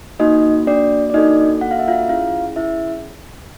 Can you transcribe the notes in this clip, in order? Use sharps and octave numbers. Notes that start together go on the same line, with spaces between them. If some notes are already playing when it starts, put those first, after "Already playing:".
A#3 D#4 F#4 D#5
D4 D5
D5
A#3 D4 D#4 F#4 A4 D#5
F#5
F5
E5
F4 F5
C#4 E4 F4 G#4 F5
E4 E5